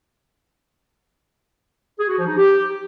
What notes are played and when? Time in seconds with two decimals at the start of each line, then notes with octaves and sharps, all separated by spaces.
1.99 G#4
2.08 F#4
2.18 F3
2.27 D#4
2.36 G4